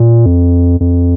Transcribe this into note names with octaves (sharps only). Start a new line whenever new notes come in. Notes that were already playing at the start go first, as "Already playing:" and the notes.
Already playing: A#2
F2
F2